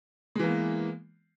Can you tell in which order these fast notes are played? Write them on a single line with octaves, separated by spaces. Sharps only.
G#3 E3 A#3 B3